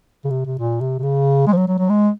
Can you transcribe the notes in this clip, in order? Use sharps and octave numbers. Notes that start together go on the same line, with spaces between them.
C#3
C3
C3
A#2
C3
C3
C#3
G#3
F3
F#3
F#3
F#3
G#3